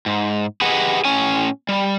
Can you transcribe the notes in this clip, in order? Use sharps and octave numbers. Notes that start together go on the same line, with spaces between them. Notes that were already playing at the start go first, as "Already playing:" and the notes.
G#2
G4 G#4 B4 D#5 F#5
A2 C#4 G#5
G3